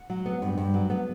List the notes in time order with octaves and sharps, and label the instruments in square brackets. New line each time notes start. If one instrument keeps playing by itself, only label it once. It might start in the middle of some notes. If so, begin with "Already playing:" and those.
Already playing: [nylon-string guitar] F#5
F#3
B3
G2
G2
F#3
B3